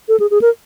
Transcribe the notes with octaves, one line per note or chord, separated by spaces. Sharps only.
A4
G#4
G#4
A#4